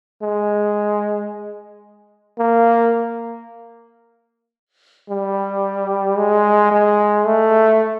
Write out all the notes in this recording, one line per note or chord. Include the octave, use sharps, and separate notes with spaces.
G#3
A#3
G3
G#3
G#3
A3